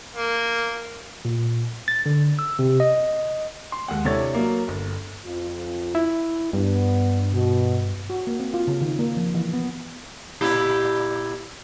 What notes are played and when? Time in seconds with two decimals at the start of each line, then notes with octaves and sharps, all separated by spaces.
0.16 A#3
1.25 A#2
1.88 A6
2.06 D3
2.39 E6
2.59 C3
2.80 D#5
3.72 C6
3.88 D#2 G#3 F#5
4.05 C3 D4 E4 A4 C#5 A6
4.35 F#3 A#3
4.68 G1
5.25 F2 F4
5.95 E4
6.53 G2 B3 D4
7.32 B2
8.10 F#4
8.27 A#3
8.40 C4
8.54 F4
8.67 C#3
8.81 D#3
8.99 A#3
9.17 F3
9.34 E3
9.54 B3
10.41 A#2 E4 G4